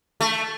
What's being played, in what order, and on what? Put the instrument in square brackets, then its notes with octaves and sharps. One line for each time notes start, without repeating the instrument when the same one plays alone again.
[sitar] A3